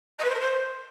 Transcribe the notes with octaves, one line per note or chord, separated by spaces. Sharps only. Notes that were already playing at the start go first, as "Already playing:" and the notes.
D#5
B4
C5
A#4
C5